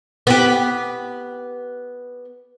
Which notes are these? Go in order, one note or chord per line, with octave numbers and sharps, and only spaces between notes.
B3 G4